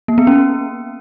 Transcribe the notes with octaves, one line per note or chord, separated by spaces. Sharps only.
A#3
B3
C#4